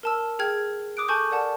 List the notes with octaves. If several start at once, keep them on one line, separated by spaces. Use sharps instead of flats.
A#4 A5 E6
G#4 G5 F6 G#6
D6 D#6 F#6 D7
A4 G#5 A5 C#6 G6
A#4 D5 F#5 A5